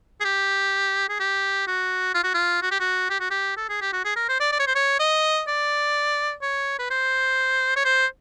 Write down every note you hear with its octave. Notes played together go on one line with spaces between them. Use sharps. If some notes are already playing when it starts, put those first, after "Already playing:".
G#4
G4
G#4
G4
F#4
F4
F#4
F4
F#4
G4
F#4
G4
F#4
G4
A4
G#4
G4
F#4
G#4
A#4
C5
D5
D5
C#5
C5
C#5
D#5
D5
C#5
B4
C5
C#5
C5